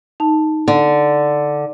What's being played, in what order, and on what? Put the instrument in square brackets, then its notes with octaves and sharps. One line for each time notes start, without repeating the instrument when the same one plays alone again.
[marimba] D#4 A5
[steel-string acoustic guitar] D3